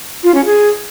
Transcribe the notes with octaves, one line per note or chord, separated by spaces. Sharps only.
F4
C#4
G#4